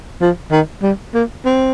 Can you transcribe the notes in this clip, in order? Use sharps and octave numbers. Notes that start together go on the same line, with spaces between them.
F3
D#3
G3
A#3
C4